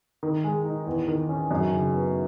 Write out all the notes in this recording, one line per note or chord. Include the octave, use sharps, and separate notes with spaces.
D#3
G#3
D#4
E2
D#3
C#4
F#2
C#3
B3